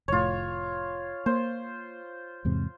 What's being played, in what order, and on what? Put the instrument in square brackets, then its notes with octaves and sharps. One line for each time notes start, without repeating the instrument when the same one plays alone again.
[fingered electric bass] F1 A2 [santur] F4 C#5
[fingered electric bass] A#3 [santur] C5
[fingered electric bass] E2 G#2 C3